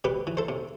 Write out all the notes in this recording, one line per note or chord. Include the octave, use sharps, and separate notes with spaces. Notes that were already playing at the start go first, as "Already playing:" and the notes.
C3 G4 B4
E3
A4 C5
C3